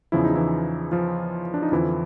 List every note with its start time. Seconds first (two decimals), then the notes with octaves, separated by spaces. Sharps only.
0.12 E2 C#3 F3 E4
0.24 D#4
0.36 E3 E4
0.92 F3 F4
1.54 D4
1.63 D#4
1.72 F2 D3 E3 F3 E4